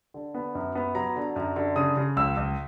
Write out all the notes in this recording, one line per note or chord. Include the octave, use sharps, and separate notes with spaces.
D3
B3
F#2
B3
F#3 A#5
D3
F#2
D3
C#3 D#6
C#3
C#2 E6
C#2